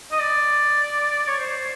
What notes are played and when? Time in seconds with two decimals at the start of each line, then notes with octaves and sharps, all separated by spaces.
0.12 D#5
0.19 D5
1.27 C#5
1.39 C5